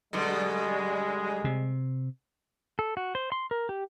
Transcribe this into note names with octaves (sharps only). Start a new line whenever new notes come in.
F#2 B2 D3 G3 G#3
C3
A4
F#4
C5
C6
A#4
G4